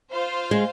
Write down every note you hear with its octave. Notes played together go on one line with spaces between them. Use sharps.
F4 C5 F5
G#3